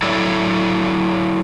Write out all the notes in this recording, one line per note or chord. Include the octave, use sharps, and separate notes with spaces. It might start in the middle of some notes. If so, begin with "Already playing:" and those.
F#3 E4 A4 C#5 D5